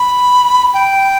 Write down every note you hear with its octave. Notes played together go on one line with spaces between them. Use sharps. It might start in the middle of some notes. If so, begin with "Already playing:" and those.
Already playing: B5
G5